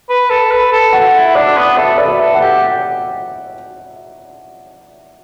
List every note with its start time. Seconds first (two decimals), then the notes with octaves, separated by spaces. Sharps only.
0.09 B4
0.30 A4
0.51 B4
0.72 A4
0.93 F#5
1.15 E4
1.35 D4 D5
1.57 B3
1.77 A4 E5
1.97 B4 D5
2.06 E5
2.20 A4
2.34 F#5
2.41 G4